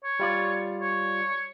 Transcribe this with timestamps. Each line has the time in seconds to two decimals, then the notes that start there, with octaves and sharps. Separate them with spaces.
0.04 C#5
0.20 G3 F4 D5
0.81 C#5